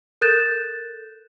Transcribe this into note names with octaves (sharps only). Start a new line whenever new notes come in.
A4 A#4 F#6 G6 A6 E7